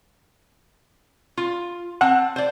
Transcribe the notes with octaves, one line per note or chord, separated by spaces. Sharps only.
F4
C4 F#5 A5
C5 D5